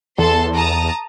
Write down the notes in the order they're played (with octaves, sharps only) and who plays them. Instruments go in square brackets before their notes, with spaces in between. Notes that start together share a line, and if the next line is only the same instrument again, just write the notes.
[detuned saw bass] E2 [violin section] A4 A5 C6
[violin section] A5 A#5 D#6